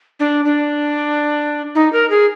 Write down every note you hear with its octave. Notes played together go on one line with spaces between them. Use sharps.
D4
D4
D#4
A#4
G#4